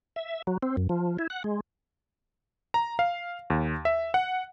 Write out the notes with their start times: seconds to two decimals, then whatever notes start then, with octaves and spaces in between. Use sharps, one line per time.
0.16 E5
0.47 F#3
0.63 C4
0.77 F#2
0.89 F3
1.19 E4
1.30 F#5
1.44 G#3
2.74 A#5
2.99 F5
3.50 D#2
3.85 E5
4.14 F#5